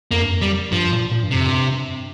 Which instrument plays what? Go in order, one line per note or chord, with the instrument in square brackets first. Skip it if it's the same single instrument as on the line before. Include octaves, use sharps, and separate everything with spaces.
[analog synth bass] F2 [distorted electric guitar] A#3
[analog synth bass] G2
F2
[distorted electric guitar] G3
[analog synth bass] G2 [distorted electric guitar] F3
[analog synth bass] A#2
A#2
G2
[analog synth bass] F2 [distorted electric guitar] C3
[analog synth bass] G2